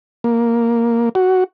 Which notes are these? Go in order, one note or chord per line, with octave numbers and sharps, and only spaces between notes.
A#3
F#4